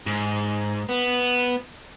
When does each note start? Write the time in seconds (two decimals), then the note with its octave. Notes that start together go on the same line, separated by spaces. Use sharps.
0.07 G#2
0.89 B3